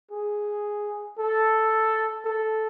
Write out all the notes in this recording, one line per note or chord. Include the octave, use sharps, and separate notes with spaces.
G#4
A4
A4